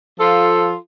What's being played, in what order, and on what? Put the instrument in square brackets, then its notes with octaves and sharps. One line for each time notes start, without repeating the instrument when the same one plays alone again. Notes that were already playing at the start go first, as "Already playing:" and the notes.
[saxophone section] F3 F4 A4